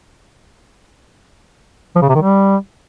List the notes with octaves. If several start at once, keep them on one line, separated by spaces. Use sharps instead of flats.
F3
C#3
C3
D#3
G3